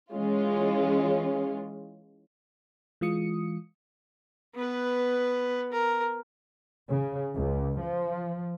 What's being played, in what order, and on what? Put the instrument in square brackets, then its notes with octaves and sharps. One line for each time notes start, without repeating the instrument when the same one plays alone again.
[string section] E3 G#3 C#4 F4
[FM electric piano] E3 G#3 F4 D#6 C#7
[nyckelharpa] B3 B4
A#4
[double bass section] C#3
C#2
F3